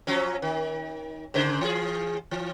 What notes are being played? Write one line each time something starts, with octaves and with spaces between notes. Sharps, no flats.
F3 F#3 C#4
D#3
G#2 C#3 C5
E3 G#4
E3